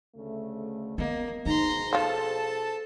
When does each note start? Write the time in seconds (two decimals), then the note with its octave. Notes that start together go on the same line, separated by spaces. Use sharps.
0.15 D2 C#3 A3
0.98 A#3 B3 D#5
1.46 B2 D#4 G#4 C5 A#5 C6
1.93 F3 F4 A4 A5